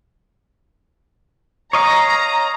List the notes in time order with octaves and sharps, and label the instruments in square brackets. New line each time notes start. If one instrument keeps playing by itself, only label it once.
[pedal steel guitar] C#5 D#5 F5 [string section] A#5